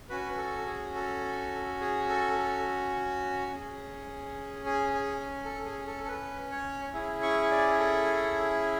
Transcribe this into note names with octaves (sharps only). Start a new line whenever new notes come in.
C#4 F#4 B4
A4
G#4
A4
G#4
A4
A4
C#4 G#4
G#4
G#4
A4
G#4
A4
A4
B4
C#5
C#4 E4 G#4
C#6
D5
A4